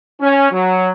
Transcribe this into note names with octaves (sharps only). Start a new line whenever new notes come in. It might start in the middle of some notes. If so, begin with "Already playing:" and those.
C#4
F#3